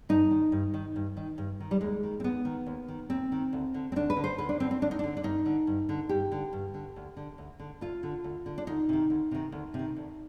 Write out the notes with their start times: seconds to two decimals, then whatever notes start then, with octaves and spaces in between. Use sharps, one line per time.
0.09 G2 D#4
0.31 D#3
0.52 G2
0.74 D#3
0.96 G2
1.17 D#3
1.38 G2
1.60 D#3
1.71 G3
1.81 D#2 G#3
2.03 D#3
2.20 C4
2.24 D#2 B3
2.45 D#3
2.66 D#2
2.88 D#3
3.10 D#2 C4
3.32 D#3
3.53 D2
3.74 D3
3.92 C4
3.96 D2 D4
4.10 B4
4.16 D3
4.24 C5
4.38 D2 B4
4.49 D4
4.60 D3 C4
4.71 C4
4.82 D2 D4
4.91 D#4
4.99 D3 D4
5.17 D4
5.23 G2 D#4
5.46 D3
5.67 G2
5.89 D3
6.09 G2 G4
6.32 D3
6.53 G2
6.74 D3
6.96 D2
7.17 D3
7.38 D2
7.60 D3
7.81 D2 F4
8.03 D3
8.24 D2
8.46 D3
8.58 D4
8.67 D2 D#4
8.89 C3 D#3
9.10 D2
9.31 C3 D#3
9.52 D2
9.74 C3
9.79 D#3
9.96 D2